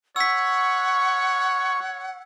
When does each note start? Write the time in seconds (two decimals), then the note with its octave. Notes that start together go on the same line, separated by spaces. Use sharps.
0.16 C#5 F#5 C#6 E6 B6